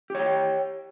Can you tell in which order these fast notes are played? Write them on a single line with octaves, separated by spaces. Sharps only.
G4 C#5 G5